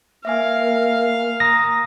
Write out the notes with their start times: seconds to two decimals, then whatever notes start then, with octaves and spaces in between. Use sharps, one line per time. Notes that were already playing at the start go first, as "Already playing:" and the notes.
0.25 A#3 E5 F5 G#5
1.40 A#5 D#6 A#6